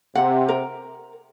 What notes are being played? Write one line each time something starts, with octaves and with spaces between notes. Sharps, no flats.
C3 F#5
A#4